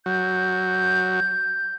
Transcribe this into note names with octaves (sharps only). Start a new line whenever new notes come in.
F#3 G6